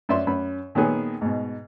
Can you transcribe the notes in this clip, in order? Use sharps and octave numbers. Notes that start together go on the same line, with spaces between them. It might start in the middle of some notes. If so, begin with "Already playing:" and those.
F#2 D5 E5 C6
F#2 B5
A#2 D#3 F#3 B3 G#4
G#2 B2